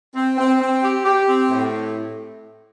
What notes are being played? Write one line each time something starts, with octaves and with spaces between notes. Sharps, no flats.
C4
C4
C4
G4
G4
C4
A2